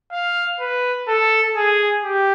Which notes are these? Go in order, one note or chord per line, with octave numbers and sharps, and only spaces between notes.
F5
B4
A4
G#4
G4